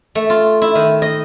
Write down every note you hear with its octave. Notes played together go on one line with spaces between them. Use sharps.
A3
F4
E4
D#3
D#5